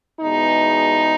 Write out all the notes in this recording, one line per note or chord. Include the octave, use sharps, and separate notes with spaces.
E2 B2 G#3 D#4